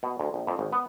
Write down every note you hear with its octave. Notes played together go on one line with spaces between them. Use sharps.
B2
D2
A#1
F2
G#1
B3